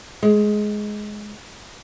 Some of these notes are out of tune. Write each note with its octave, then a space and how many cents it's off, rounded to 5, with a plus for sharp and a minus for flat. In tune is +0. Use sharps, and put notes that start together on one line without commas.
G#3 +15